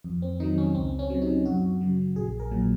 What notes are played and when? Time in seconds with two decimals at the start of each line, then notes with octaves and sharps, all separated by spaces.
0.04 F2
0.22 C4
0.40 D#3 F#3 D#4
0.58 C#4
0.75 C#2 C4
0.99 C#4
1.10 C3 F#3
1.22 D#4
1.46 F#2 F#4
1.81 C#3 F#3
2.16 A#1 G#4
2.40 A#4
2.51 A#2 F#3